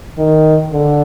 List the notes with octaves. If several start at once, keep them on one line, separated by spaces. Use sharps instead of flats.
D#3
D3